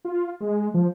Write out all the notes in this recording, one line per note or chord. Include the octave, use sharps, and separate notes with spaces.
F4
G#3
F3